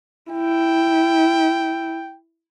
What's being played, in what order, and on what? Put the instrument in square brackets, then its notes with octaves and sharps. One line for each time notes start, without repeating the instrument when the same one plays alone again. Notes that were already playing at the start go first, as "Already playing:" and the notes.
[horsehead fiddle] E4 [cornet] G5